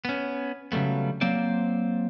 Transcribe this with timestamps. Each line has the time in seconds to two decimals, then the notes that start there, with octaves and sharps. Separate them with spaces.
0.05 B3 C#4
0.72 C#3 F#3 G3 A3 B3
1.21 F#3 A#3 C4 C5 D5